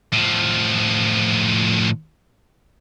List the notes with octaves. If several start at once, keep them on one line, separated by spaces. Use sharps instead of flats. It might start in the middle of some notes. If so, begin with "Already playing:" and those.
A2 F3